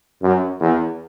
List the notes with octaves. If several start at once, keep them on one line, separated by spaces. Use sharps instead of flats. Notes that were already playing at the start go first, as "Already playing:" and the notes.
F#2
E2